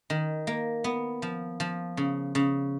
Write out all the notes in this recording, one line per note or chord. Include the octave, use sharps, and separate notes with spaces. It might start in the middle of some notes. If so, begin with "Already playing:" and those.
D#3
A#3
B3
F3
F3
C#3
C#3